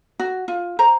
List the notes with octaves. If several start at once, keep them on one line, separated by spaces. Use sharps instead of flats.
F#4
F4
C5 A#5